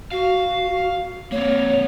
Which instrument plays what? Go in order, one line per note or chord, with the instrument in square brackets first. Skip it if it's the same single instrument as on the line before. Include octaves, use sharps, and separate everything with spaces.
[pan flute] F#4 [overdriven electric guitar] F5
[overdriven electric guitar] A#3 C4 [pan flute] C#5